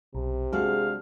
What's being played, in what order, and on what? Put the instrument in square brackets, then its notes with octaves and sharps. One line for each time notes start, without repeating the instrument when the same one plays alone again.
[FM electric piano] B1 [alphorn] C3
[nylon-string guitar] G#3 D4 F#4 [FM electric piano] G#4 [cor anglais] F5